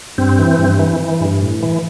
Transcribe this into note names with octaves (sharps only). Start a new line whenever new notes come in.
G2 C4
E3
G2
E3
E3
G2
A2
E3